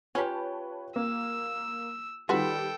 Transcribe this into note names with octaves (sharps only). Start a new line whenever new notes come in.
C#4 F4 G4 B4 C#5 A5
A#3 E6
D#3 G3 F4 F#4 A4 B4 G5